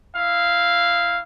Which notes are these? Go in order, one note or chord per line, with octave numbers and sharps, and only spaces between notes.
E4 F5